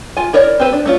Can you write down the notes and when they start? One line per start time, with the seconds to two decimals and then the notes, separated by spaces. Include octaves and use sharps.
0.17 F4 G#5
0.33 E4 A#4 C#5 D5
0.60 C4 G4 B4 C5
0.73 D4
0.85 A3 C#4 F4